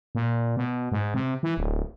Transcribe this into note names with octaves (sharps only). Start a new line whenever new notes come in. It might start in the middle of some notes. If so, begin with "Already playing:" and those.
A#2
B2
G#2
C3
E3
D1